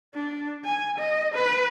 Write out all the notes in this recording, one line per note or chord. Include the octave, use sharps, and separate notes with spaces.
D4
G#5
D#5
B4